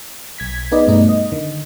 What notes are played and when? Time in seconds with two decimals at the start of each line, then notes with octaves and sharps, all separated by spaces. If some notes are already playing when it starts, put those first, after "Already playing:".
0.38 B1 G#6 B6
0.71 B3 D#4 G#4 B4 D5 D#5
0.87 G2 B2 A3 D#4
1.09 D#5
1.32 D3 D#3